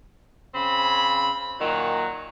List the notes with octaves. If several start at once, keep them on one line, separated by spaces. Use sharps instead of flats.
C#3 C4 B5
A#2 D#3 F#3